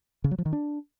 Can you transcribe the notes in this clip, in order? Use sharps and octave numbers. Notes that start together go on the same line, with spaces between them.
C#3
F#3
F3
D#3
D4